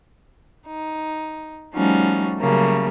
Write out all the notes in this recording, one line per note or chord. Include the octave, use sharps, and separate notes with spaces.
D#4
F3 G3 A3 C#4 D#4 F#4
C#3 F#3 G3 A3 A#3